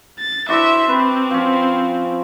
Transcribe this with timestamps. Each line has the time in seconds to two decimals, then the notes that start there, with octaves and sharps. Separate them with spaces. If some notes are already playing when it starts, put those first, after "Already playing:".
0.19 A6
0.49 D4 E4 F#4 C5 E5
0.89 C4 B4
1.31 F3 C#4